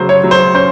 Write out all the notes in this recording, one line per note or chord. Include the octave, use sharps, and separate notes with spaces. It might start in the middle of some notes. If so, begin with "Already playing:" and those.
Already playing: C#3 F#3 C5
C#5
F#3
C5
C#4 C5